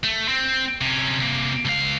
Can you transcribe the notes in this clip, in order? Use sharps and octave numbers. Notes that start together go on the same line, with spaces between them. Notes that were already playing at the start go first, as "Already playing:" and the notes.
A3
C4
C3 C#4
C3 A#3
C#2 F5